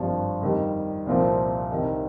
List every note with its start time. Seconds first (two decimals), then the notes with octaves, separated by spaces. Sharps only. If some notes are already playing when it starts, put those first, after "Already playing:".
Already playing: G#1 G2 F3
0.41 F2 D#3 G3
1.06 C2 A#2 F3 C4
1.71 C2 C3 D#3